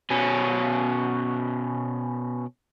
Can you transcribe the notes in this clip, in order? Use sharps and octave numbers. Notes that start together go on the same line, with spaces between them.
B2 C#4